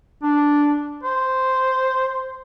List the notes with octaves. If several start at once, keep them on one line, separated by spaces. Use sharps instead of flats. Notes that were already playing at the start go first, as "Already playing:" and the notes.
D4
C5